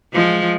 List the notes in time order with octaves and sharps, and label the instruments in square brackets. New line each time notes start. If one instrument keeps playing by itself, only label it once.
[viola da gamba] F3 G#3